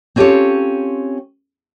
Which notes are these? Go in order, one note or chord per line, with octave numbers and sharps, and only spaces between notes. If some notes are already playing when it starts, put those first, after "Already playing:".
C4 C#4 F4 G4 A4 C#5